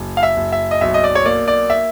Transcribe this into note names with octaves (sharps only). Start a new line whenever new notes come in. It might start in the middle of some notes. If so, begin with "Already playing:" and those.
Already playing: F#1
F5
E5
F#1
E5
D#5
B1 E5
D#5
D5
C#5
A#3 D5
D5
E5